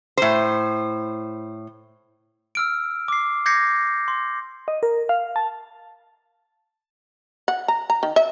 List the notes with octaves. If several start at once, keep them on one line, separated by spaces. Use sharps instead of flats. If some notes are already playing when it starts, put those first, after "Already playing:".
A2 C5
E6 F6 D7
D6 C7
D6 G6 G#6 A#6 C7 C#7
C6
D#5
A#4
F5
A5
F#5
A#5
A#5
D#3
E5